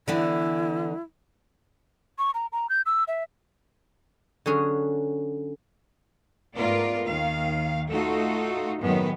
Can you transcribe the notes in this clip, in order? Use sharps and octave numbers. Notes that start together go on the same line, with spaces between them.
D3 E3 B3 E4
C#6
A#5
A#5
G6
E6
E5
D3 F#3 C#4 G#4
G#2 A3 B3 F4 A#4 D5
D#2 D#3 F5
A3 D#4 F4 F#4 A4
F#2 A2 D#3 G#3 B3